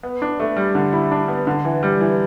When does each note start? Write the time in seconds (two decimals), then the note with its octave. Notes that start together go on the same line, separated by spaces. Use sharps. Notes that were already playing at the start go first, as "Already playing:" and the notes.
0.03 B3
0.22 D4
0.40 A3
0.56 G3
0.75 D3
0.93 E4
1.11 D4
1.28 B3
1.47 D3
1.65 E3
1.83 G3
2.00 E3